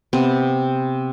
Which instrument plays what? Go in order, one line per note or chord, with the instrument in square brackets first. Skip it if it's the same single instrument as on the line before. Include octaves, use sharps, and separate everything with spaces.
[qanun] C3 B3 C4